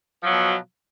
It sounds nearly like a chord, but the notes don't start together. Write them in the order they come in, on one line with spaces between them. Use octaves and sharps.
F3 F#3 B2